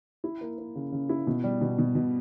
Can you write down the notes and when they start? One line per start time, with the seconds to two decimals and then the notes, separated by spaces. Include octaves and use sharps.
0.24 E4
0.41 A#3
0.58 A#3
0.75 C#3
0.92 C#3
1.09 E4
1.27 B2
1.44 G3
1.61 B2
1.78 B2
1.95 B2